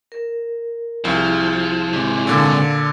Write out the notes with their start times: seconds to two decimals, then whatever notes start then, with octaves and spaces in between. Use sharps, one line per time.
0.12 A#4
1.05 C2 F3 E4 F4 G#4
1.93 G#2 C3
2.27 A#2 D3